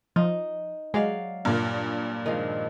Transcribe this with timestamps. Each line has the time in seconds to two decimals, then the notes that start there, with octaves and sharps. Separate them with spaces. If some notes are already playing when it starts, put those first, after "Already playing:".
0.16 F3 D#4
0.94 F#3 G#3 D5 F5
1.45 G2 A#2
2.26 D#3 F3 G#3